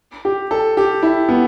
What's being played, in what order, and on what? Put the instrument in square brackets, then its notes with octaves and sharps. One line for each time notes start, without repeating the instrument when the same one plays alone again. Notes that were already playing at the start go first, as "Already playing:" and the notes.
[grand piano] G4
A4
G4
E4
B3